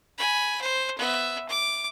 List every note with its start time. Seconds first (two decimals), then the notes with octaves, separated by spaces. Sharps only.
0.18 G#5 B5
0.62 C5
0.99 B3 E5
1.49 D6